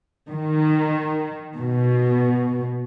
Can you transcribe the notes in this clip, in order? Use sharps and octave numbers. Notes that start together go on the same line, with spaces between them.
D#3
B2